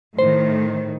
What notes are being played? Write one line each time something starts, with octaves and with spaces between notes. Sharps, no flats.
A2 D#3 C5